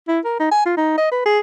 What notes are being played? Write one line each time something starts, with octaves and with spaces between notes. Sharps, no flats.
E4
A#4
D#4
G#5
F4
D#4
D#5
B4
G#4